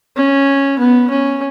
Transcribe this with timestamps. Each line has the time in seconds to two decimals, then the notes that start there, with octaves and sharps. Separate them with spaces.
0.17 C#4
0.79 B3
1.11 C#4